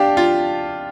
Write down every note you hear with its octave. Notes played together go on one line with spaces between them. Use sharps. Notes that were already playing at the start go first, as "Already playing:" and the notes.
Already playing: D4 G4 F5 G5 A5
F4